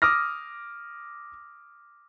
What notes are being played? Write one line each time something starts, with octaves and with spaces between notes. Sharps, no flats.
D6 D#6 F6 A#6